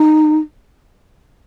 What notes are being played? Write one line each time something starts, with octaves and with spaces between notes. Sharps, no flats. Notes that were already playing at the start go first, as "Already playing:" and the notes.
Already playing: D#4